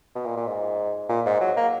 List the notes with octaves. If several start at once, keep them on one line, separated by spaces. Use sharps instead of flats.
B2
A#2
A#2
G#2
A#2
G#2
F#3
A#3